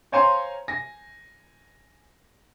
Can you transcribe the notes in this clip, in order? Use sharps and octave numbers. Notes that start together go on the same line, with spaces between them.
C5 C#5 F5 G#5 A#5 C6
G#5 A#6